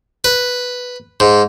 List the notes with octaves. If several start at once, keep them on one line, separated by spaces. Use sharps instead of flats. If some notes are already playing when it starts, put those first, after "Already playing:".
B4
G#2